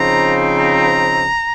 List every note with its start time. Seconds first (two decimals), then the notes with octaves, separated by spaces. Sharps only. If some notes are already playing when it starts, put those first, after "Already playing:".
Already playing: C#3 F3 C4 D#4 A#5
0.56 A#5